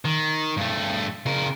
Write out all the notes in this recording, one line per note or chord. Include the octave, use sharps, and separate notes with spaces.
D#3
G2 A3
C#3 A#4